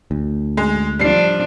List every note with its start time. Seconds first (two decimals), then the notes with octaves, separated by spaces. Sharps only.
0.11 D2
0.57 G#3
0.99 F3 G3 D4 F4 C7